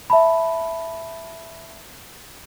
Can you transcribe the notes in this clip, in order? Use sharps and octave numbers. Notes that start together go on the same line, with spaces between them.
E5 A5 B5